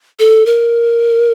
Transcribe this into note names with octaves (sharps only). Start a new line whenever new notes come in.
A4
A#4